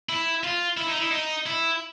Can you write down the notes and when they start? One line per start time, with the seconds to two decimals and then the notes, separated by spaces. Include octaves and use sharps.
0.09 E4
0.43 F4
0.77 E4
0.87 D#4
0.98 E4
1.11 D#4
1.46 E4